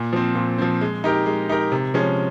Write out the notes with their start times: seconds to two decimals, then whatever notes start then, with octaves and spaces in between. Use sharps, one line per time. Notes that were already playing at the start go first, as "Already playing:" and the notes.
Already playing: A#2
0.13 F3 C4
0.35 A#2
0.58 F3 C4
0.81 G#3
1.04 D#4 G4 A#4
1.26 G#3
1.49 D#4 G4 A#4
1.72 C3
1.94 F3 G#3 C#4